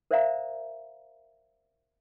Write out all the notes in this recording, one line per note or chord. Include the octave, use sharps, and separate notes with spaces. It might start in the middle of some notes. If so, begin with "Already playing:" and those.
A#4 C5 D5 E5 F5 A#5